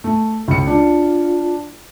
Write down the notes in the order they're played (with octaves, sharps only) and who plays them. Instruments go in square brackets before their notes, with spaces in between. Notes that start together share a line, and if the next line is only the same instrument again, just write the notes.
[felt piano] A3
C#2 C#7
[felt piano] D4 [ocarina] F4